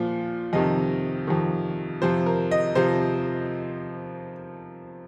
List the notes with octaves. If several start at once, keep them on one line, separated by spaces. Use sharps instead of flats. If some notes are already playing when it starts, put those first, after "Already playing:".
Already playing: A#2 F3
F2 C3 D#3 D#5
F2 C3 D#3
F2 C3 F3 C5
A#4
D#5
C3 F3 C5